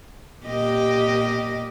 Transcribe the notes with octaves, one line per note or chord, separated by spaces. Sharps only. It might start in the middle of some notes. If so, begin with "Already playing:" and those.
A#2 G4 D#5